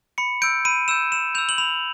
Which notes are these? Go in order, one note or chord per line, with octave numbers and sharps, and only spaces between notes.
B5 C#7
E6 G6 D7
B5 D#7
E6 G6 E7
B5 E7
E6 G6 F7
F#7
B5 F7